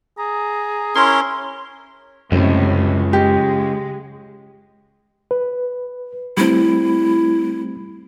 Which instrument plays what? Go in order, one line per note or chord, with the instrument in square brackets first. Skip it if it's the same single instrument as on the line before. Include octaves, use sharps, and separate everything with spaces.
[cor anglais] G#4 [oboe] A#5
[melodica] C#4 A#4 C#5 [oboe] E4 [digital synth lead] C6
[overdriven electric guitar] C#2 [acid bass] F#2 [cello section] A2 C3 G3
[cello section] G#3 [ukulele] G4
[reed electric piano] B4
[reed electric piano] G3 A3 C4 [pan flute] E4